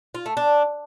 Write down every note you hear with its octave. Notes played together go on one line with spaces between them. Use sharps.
F4
A3
D4